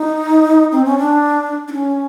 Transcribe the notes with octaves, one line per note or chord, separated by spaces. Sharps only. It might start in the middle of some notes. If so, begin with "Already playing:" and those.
Already playing: D#4
C4
C#4
D4
D4
C#4